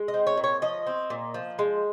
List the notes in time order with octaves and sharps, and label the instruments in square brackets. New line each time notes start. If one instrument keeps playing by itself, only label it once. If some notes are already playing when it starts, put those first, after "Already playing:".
Already playing: [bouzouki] G#3
D#5
C4
C#5
A#2
C#5
F3 D#5
C4
A#2
F3
G#3